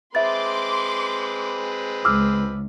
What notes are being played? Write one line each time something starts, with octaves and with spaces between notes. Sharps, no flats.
G#3 C4 B4 E5 C6 D6 A6
C#2 D6 E6 F6